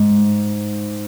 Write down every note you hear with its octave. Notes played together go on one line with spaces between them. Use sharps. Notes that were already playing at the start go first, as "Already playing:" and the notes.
Already playing: G#2